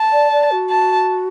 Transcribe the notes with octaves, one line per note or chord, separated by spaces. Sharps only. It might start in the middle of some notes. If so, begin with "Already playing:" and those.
Already playing: A5
D5
D5
F#4
A5